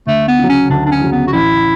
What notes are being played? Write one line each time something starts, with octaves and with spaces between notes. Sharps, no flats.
D2 A3
B3
C#3 F#3
C#4
D2 D4
D4
C#4
C#3 F#3
B3
F#4
A1 E4